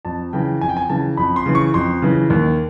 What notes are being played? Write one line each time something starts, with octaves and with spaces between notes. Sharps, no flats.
F2 A5
C#3 E3 G5
F2 G#5
G5
G#5
C#3 E3 A5
F2 B5
C6
C#3 E3
C#6
F2 C6
C#3 E3
D#2